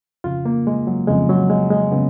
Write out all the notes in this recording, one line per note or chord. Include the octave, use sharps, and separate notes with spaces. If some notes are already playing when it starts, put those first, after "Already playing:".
F2 C#3 F4
A#3
G#3
F#3
F2 C#3 G#3
F#3
G#3
G#3
C#3 B3